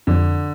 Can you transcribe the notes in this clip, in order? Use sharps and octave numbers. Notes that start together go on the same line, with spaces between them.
F2 D3